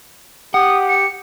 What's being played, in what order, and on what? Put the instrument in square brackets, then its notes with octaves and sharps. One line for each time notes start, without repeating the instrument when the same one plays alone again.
[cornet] G4 [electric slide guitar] F#5 [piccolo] D#6
[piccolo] C#7